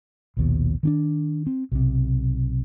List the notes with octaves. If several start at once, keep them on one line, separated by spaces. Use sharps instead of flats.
A#1 D#2 B2
D#3 C#4 D4
C4
B1 C3